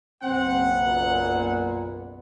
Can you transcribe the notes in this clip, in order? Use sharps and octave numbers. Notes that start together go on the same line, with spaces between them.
F#1 B1 B3 C4 F#5
A#2